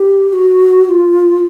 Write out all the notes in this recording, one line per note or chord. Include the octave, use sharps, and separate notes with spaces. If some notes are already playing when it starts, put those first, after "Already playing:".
Already playing: G4
G4
F#4
F#4
F4